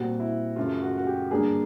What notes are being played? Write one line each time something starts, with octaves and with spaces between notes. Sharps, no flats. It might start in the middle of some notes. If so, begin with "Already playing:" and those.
Already playing: A#2 G3 C4 F#4
E4
F#2 C#3 F#3 A3 F4
F#4
F#4
G4
G2 D3 G3 A#3 D4 G#4